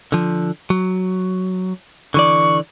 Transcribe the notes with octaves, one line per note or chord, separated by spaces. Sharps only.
D3 F3
F#3
D3 E3 D5 C#6